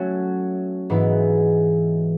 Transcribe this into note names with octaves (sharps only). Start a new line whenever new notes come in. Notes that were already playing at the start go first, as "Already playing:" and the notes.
Already playing: F#3 A3 C#4 F#4
G#2 E3 G#3 B3 E4